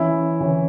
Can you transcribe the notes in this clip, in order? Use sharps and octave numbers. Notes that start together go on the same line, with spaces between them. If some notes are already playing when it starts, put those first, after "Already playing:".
Already playing: E3 C#4 E4 E5
E3 C#4